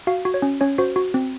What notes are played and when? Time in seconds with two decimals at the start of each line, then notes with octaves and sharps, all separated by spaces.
0.07 F#4 F5
0.25 F#4
0.34 C#5
0.42 C#4
0.61 C#4 C#5
0.78 F#4 C5
0.96 F#4
1.14 C4